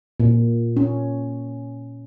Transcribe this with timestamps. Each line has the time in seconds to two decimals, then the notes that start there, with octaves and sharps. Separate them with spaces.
0.20 A#2
0.77 C#4